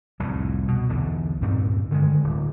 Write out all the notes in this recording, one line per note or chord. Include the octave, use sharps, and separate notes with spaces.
C2 F2 A2
B2
B1 E2 D3
D2 G2 A#2 C4
D3 D#3 G#3
D1